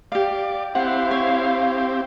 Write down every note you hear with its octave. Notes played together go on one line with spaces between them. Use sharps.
G4 D5 F5
C4 E4 G4 F5 F#5
C#5